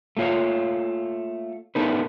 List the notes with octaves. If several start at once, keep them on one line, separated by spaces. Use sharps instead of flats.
A3 A#3 F4 C#5 F5
A3 B3 D4 D#4 A#4 B4